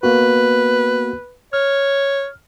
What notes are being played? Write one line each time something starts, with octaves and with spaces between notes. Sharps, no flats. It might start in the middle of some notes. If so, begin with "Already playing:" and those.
A#3 B3 F#4 B4
C#5 F6